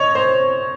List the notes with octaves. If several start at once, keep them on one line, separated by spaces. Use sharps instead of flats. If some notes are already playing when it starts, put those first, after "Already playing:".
Already playing: C#5 D#5
C5